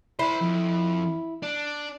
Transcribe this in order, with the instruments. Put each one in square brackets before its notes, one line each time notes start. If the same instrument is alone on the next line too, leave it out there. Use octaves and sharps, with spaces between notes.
[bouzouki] E4 [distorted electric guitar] C5 B5
[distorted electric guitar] F2
D4